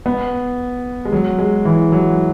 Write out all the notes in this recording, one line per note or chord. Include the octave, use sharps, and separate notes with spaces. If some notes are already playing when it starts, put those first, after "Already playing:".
B3
G#3
F#3
G#3
E3
F#3